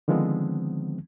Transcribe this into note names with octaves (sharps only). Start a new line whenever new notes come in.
D3 D#3 F3 G#3 B3 C4